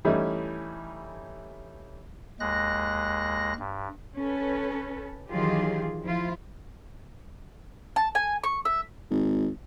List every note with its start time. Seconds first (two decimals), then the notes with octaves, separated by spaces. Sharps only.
0.05 E3 G3 A3 C#4 D#4 E4
2.40 D#2 G#3 F#6 A#6
3.59 G2
4.17 C#4 A4 B4
5.30 D#3 E3 F#3 F4 G4 G#4
6.03 F3 E4 F4
7.96 A5
8.15 G#5
8.44 C#6
8.65 E5
9.11 G#1